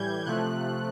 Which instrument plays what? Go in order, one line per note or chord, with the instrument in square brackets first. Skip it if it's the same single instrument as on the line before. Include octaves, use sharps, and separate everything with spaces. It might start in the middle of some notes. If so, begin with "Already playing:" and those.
Already playing: [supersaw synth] A2 E3 G3 G6 G#6
C3 F3 A3 F#6